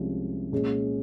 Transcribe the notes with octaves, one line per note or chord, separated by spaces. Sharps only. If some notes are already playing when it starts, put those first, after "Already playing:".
Already playing: C2 C3 F3 G#3 C#4
A#2 G#3 C#4 G#4